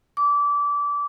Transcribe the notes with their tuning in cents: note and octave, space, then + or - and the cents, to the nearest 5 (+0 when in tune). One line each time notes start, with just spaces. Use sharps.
D6 -25